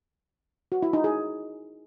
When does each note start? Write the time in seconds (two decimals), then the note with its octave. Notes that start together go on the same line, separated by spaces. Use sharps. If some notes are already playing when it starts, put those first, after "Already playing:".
0.72 F#4
0.83 E4
0.93 D#4
1.04 G#4